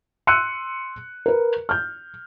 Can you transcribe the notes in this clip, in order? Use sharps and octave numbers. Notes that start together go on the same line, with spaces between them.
C6 E6 F#6 C#7 D#7
A#4 B4
F6 G6